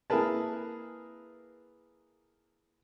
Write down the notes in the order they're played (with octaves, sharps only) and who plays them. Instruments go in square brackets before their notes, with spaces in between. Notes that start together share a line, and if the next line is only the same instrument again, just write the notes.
[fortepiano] A#3 E4 G#4 A#4 B4 A5